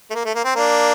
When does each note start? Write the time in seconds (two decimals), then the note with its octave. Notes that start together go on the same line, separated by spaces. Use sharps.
0.10 A3
0.15 A#3
0.25 A3
0.35 A#3
0.44 C4
0.55 A#3 D4